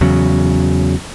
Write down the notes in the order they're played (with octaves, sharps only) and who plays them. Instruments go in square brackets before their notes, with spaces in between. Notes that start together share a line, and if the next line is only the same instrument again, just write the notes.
[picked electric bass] E2 C#3 F#3